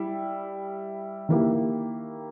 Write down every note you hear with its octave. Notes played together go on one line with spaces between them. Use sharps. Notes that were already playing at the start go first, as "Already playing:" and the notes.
Already playing: G3 E4
D#3 A#3 E4 G4